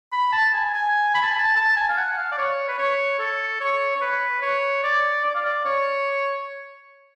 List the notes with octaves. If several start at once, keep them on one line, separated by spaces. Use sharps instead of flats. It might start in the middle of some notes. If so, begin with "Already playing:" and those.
B5
A5
G#5
G#5
B5
A5
G#5
A5
A5
G#5
F5
F#5
F#5
F5
D5
C#5
B4
C#5
A4
C#5
C#5
B4
C#5
D5
D5
F5
D5
C#5